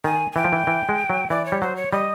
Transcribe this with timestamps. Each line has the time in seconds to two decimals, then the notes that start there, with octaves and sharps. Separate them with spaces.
0.04 D#3 G#5
0.32 G#5
0.36 E3 G5
0.44 F3
0.52 E3
0.67 E3
0.89 G#3
1.10 F#3
1.30 E3 D5
1.45 C#5
1.52 G3
1.61 F#3 C5
1.76 C#5
1.92 G3 D#5